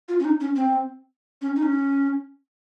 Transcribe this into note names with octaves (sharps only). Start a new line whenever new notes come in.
F4
C#4
D#4
C#4
C4
C#4
D#4
C#4